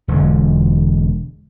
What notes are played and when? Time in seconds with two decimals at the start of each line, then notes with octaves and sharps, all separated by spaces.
0.08 E1 D3 G#3